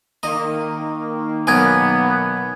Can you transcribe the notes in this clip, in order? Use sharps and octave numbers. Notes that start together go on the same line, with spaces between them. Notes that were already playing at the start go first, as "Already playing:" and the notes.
D#3 A#3 D#5
B1 B3 A#4 D#5 G#5 G#6